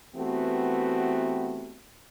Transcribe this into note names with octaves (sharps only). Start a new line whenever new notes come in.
E3 A3 B3 C4 F#4 G4